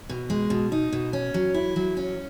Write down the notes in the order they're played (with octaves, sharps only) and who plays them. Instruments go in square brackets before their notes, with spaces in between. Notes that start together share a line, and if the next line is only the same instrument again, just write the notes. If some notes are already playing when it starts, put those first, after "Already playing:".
[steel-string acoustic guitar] B2
G#3
B2
D#4
B2
C#4
F#3
E4
F#3
C#4